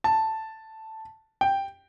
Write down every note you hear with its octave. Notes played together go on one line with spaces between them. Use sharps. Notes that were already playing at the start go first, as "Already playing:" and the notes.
A5
G5